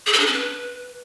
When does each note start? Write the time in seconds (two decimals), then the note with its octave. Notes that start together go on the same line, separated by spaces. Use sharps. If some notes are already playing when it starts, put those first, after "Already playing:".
0.06 G#4
0.13 A4
0.20 D4
0.26 C#4
0.33 B4